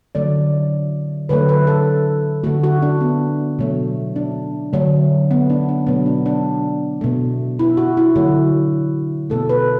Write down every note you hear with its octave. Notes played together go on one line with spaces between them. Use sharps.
D3 F#3 A3 D5
D3 F#3 A3 B4
B4
A4
D3 A3 F#4
F#4
D4
B3
B2 F#3 A3
D4
D3 F#3 A3
B3
D4
D4
B2 F#3 A3 B3
D4
D4
B2 A3
E4
F#4
E4
D3 F#3 A3 F#4
B2 A3 A4
B4